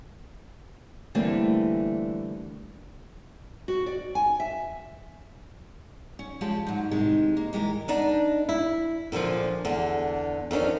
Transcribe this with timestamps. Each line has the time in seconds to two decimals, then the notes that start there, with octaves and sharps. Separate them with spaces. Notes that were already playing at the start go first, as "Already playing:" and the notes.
1.15 D3 E3 G3 A3 A#3 C4
3.68 F#4
3.86 D5
4.15 G#5
4.40 E5
6.19 C#4
6.41 F3 G#3 F4 G4 C#5 A5
6.67 G#2 F#3
6.91 A2 C3 D#3 G#3
7.37 A#3
7.53 E3 G#3 G4 A#4
7.88 B3 D4 D#4
8.49 E4
9.12 A#2 D3 E3 F3
9.65 E2 D3
10.51 F2 D#3 C#4 D4